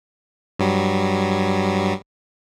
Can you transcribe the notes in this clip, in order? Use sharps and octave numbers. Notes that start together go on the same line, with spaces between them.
G2 F#3 G3